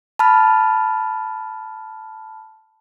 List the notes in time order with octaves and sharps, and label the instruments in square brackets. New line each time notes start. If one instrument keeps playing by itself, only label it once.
[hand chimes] A5 B5 F6